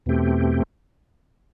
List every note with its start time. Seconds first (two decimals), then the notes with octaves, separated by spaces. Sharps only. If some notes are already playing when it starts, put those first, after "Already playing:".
0.06 E2 B2 A3 C4 G4